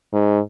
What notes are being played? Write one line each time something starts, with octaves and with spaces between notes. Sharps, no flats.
G#2